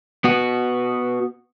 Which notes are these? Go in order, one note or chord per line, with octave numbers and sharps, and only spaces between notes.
B3 F#4